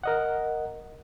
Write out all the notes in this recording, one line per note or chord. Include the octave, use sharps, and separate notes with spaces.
A#4 D#5 F#5